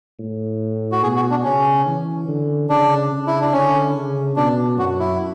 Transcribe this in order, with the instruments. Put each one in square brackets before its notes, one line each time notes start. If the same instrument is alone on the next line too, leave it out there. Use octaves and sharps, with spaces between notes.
[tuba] A2
[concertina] F#4
[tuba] B2 [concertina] G#4
[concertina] F#4
D4
[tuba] C#3 [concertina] C#4
[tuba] E3
D3
[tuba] C#3 [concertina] D4
[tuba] C#3
[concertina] E4
D4
[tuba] D3 [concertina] C#4
[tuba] C#3
[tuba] B2 [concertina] D4
[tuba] F#2 [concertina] F#4
[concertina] E4